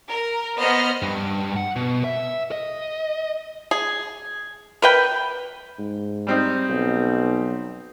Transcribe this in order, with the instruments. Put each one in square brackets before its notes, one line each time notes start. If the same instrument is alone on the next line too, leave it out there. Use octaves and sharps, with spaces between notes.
[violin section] A#4
B3 B4 C5 D#5 F6
[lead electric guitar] G2
F#5
B2
E5
D#5
[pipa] G#4
A#4 B4 G5
[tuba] G#2
[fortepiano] G3 C4 D#4
[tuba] B1